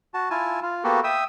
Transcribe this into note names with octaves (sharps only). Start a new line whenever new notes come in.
F#4 A5
E4 F4 G#5 A5
F4
A#3 B3 F#4 G4 A4
E5 G5 D#6 E6